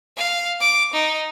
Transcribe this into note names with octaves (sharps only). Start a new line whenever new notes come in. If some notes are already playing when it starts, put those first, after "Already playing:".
F5
D6
D#4